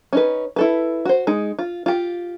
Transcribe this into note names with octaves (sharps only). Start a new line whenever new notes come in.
C#4 D#4 B4
E4 A4 B4
F#4 C5
G#3 D#4
F4
F4 G4